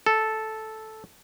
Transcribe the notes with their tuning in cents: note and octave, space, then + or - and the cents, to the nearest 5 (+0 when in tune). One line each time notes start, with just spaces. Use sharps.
A4 -5